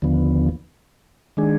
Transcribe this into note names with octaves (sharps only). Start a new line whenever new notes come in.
D#2 D3 F3 B3
D#3 G#3 D4 G#4